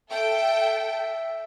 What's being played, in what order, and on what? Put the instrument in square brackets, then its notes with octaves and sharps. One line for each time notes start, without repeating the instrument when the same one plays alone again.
[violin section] A4 G5 [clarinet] E5